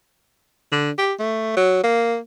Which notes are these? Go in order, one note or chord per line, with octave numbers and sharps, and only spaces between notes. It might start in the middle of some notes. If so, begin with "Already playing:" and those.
D3
G4
A3
F#3
A#3